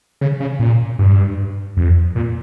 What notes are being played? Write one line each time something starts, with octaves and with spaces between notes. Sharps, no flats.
C#3
C#3
A#2
G2
F2
A#2